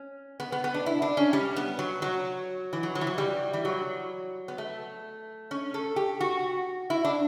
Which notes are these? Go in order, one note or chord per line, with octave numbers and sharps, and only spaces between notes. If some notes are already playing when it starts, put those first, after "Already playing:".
Already playing: C#4
B3
B3
B3
D4
E4
D4
C#4
G3
B3
F#3
F#3
E3
F#3
F#3
E3
F#3
G3
E3
F#3
B3
A3
C#4
A4
G4
F#4
E4
D4